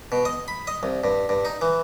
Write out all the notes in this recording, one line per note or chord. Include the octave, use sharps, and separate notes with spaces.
B2
D#5
B5
D#5
C2
G2
G2
D#4
E3